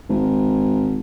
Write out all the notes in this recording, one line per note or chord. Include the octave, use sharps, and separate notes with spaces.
G#1